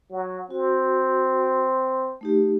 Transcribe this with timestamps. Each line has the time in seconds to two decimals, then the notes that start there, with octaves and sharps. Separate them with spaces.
0.11 F#3
0.51 C4 F#4
2.21 A3 D#4 G4